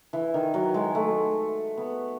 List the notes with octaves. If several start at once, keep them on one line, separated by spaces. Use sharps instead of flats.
E3
D#3
F#3
G#3
A3
B3